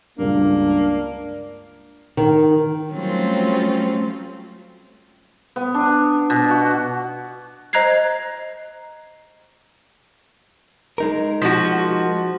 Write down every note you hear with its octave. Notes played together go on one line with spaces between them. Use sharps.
C#2 G2 A#3 D4
D#3
F#3 G3 A3 C4 C#4 F4
B3
D4
B2
F#4
C5 D#5 A#5 F#6 G#6 C7
G#3 D#4 A#4
F3 F#4